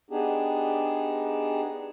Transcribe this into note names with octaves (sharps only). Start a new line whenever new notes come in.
B3 D4 D#4 G4 G#4